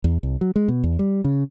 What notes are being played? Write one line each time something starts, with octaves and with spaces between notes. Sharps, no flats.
E2
C2
F#3
G#3
B2
E2
G3
C#3